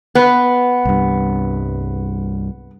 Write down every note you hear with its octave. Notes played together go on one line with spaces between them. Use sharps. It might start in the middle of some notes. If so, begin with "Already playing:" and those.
B3
C2 G2